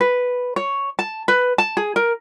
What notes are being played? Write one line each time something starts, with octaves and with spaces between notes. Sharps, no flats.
B4
C#5
A5
B4
A5
G#4
A#4